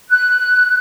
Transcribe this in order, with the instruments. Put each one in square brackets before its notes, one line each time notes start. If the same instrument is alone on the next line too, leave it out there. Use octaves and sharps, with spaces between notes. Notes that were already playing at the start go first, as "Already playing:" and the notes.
[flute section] F#6